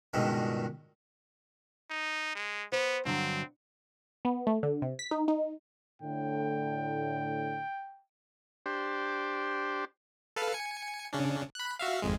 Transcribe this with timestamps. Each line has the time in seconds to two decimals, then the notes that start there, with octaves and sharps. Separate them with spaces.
0.14 C#2 G2 B2 D#3
1.90 D#4
2.35 G#3
2.72 B3 C5
3.05 G2 D3 F#3 C4
4.25 B3
4.47 A3
4.63 D3
4.82 C3
4.99 B6
5.11 D#4
5.28 D#4
6.02 A2 D3 G5
8.66 D4 G4 C5
10.36 A4 B4 F5
10.52 G#5 C#7
11.13 C#3 C#4 D4
11.55 B5 F#6
11.79 F#4 E5 F5
12.02 G#1 F2 G#3